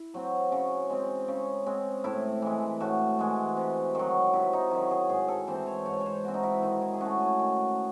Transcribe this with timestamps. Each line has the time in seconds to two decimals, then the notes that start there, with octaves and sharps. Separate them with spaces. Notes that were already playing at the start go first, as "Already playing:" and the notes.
Already playing: E4
0.14 F#3 C4
0.52 C#3
0.90 G#3 C4
1.28 C#3
1.66 G#3 C4
2.04 A2 E4
2.42 E3 G#3
2.80 A2 F#4
3.19 E3 G#3
3.57 C3
3.95 D#3 F#3
4.33 C3 E4
4.53 D#4
4.71 D#3 F#3 E4
4.91 G#4
5.09 G#2 G#4
5.28 A4
5.47 E3 C4 C5
5.67 C#5
5.86 G#2 C#5
6.00 C#5
6.06 C5
6.24 E3 C4 F#4
6.34 D#4
6.43 E4
6.63 D#3 D#4
6.82 E4
6.94 G#4
7.01 A3 C#4 F#4
7.20 G#4
7.39 D#3